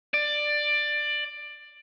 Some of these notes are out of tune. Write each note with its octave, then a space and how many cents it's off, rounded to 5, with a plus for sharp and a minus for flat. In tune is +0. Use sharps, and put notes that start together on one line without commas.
D5 +15